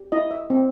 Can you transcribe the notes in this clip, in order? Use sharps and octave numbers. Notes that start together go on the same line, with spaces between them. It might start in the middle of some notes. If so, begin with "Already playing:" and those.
Already playing: G4
E4 D#5
E5
C4